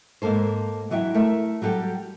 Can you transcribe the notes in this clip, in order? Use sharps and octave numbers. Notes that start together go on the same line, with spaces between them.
G#2 A#3 A4 C5
D3 E3 F#3 D#5 E5 G5
A3 A#4 E5
F#3 G3 G4 A4 G5